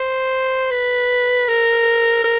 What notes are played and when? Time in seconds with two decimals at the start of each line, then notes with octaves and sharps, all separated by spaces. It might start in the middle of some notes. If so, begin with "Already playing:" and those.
Already playing: C5
0.71 B4
1.48 A#4
2.24 A#4